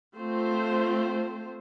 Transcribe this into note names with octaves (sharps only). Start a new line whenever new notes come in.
A3 C4 F4 C5